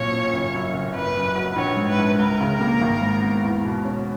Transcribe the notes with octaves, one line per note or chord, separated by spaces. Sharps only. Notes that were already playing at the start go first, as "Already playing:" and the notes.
Already playing: B1 A#2 C#5
C#4
F#1
F#2
F#1
F#1 B4
F#2
F#3
A#1 C#5
G#2
B4
A#1
C#2 A#4
C#3
A#3
G#1
G#2
B3
E2
B2
C#4